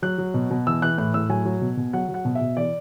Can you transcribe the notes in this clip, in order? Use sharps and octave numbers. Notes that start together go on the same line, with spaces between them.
F#3 F#6
F#3
B2
B2
E3 E6
E3 F#6
A2 F#6
A2 E6
F#3 G#5
F#3
B2
B2
F#3 F#5
F#3
F#5
B2
E5
B2
E3 D5